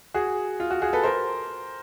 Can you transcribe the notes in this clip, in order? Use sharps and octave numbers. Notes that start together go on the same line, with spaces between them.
F#4 G#4
F4
F#4
F#4 G#4
A4 B4
A#4 C5